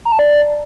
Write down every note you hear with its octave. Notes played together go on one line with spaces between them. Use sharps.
A#5
A5
D5